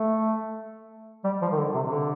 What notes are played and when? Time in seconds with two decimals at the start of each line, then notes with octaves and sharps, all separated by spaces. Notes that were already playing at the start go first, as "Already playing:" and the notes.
Already playing: A3
1.24 G3
1.42 F3
1.52 D#3
1.58 D3
1.75 C3
1.86 C3
1.91 D3